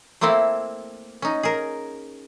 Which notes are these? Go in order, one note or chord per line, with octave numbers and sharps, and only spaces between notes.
A3 A#3 C4 E4 A4
C#4 D#4
G#4 A#4